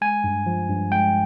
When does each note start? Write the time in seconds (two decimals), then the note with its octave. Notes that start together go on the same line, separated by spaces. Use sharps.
0.01 G#3 G#5
0.24 G2
0.46 F3
0.69 G2
0.91 G#3 G5